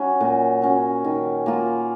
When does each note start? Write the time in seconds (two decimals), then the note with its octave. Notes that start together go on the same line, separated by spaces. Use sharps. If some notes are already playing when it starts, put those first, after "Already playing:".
Already playing: F#3 C#4
0.21 A#2
0.62 F#3 C#4
1.04 D#3
1.46 A#3 F4